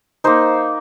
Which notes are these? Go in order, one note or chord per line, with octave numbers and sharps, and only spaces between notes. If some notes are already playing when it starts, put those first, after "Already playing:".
A#3 D#4 C5